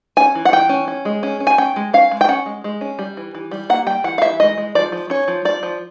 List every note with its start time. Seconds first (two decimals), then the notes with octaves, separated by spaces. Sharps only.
0.17 C#4 G#5
0.35 E3
0.45 F#5
0.53 E3 G5
0.69 C#4
0.88 C#4
1.05 G#3
1.23 C#4
1.40 C#4
1.47 G#5
1.58 C#4 G5
1.76 G#3
1.93 C#4 F5
2.11 G#3
2.21 G5
2.28 C#4 F#5
2.46 G#3
2.64 G#3
2.81 C#4
2.99 G3
3.17 E3
3.35 E3
3.51 G3
3.70 A#3 F#5
3.87 G3 G5
4.04 E3 F#5
4.18 F5
4.22 E3 E5
4.40 G#3 D#5
4.58 G#3
4.75 F3 D5
4.92 F3
5.10 C#4 C#5
5.28 F3
5.45 F3 D5
5.63 F3